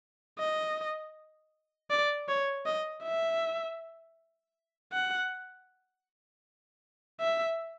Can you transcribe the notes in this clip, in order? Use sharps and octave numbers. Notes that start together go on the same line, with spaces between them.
D#5
D5
C#5
D#5
E5
F#5
E5